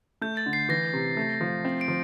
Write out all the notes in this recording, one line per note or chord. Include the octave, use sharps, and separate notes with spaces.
A3 G6
A6
D3
C7
E3 A#6
C3
A3
F3
C4
D7
F3